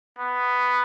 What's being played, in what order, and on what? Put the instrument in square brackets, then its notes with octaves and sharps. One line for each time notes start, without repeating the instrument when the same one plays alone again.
[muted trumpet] B3